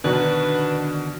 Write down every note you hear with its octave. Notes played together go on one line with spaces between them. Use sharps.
B2 D3 D#3 D4 F#4 B4